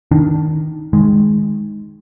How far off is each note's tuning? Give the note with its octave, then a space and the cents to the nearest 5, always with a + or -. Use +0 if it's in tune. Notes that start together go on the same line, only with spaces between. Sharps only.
D#3 +0 D4 +0
D#3 +0 G#3 +0